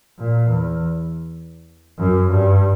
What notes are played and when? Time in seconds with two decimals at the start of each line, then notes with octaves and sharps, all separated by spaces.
0.19 A#2
0.50 E2
2.00 F#2
2.31 G2